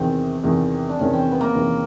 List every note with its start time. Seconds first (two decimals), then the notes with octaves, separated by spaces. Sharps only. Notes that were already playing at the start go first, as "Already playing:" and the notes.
Already playing: E2 C3 D#3 C4
0.44 E2 C3 D#3
0.89 D4
0.99 E2 C3 D#3 C#4
1.13 C4
1.32 B3
1.41 A#3
1.55 E2 C3 D#3